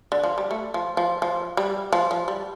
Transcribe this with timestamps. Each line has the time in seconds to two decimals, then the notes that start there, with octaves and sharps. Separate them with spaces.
0.12 D3
0.23 F3
0.38 G3
0.51 A3
0.74 F3
0.97 F3
1.22 F3
1.57 G3
1.93 F3
2.11 F3
2.28 G3